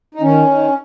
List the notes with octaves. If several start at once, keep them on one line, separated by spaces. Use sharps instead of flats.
D#4
D#3 C#4
D#3